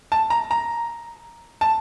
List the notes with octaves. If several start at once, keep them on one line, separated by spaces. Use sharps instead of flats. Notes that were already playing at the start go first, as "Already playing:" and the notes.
A5
A#5
A#5
A5